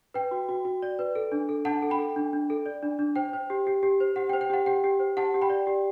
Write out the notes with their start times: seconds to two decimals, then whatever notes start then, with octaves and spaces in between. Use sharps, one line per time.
0.14 B4 G5
0.31 F#4
0.49 F#4
0.65 F#4
0.83 D5
0.99 B4
1.15 A4
1.32 D4
1.49 A4
1.65 D4 F#5 A5
1.82 A4
1.90 G5 B5
1.99 A4
2.16 D4
2.33 D4
2.50 A4
2.66 D5
2.83 D4
2.99 D4
3.16 C5 G5
3.33 C5
3.50 G4
3.67 G4
3.83 G4
4.00 C5
4.16 G4 F#5
4.29 G5
4.33 C5
4.41 G5
4.50 G4 F#5
4.66 G4 G5
4.84 G4
5.00 C5
5.17 G4 F#5 A5
5.34 G4
5.42 G5 B5
5.50 D5
5.67 G4